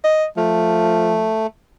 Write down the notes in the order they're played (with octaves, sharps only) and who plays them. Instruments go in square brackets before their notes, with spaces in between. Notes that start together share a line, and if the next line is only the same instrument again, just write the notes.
[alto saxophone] D#5
[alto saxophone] F3 [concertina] A3